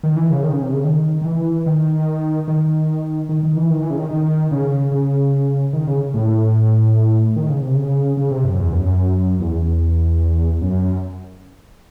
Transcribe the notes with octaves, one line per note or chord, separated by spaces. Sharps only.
D#3
E3
C#3
D#3
C#3
C3
C#3
D#3
D#3
E3
D#3
D#3
D#3
D#3
E3
D#3
E3
C#3
D#3
D#3
C#3
C#3
D#3
C#3
A2
D#3
C#3
C3
C#3
C#3
C3
F#2
E2
F#2
F#2
E2
F#2